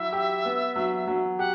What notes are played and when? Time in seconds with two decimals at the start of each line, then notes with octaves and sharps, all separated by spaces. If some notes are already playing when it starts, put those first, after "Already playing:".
Already playing: F#3 E4 E5
0.13 G4
0.45 B3
0.76 F#3
1.07 F#3
1.38 G4 F#5